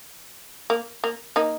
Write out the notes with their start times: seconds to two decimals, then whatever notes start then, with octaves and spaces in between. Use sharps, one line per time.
0.70 A#3
1.04 A#3
1.36 A#3 D#4